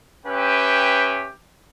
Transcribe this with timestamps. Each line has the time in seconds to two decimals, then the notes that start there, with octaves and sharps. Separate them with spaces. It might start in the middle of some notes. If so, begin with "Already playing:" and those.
0.25 C#4 G4 B4 E5 G5